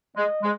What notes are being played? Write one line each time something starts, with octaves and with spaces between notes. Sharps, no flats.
G#3 D#5
G#3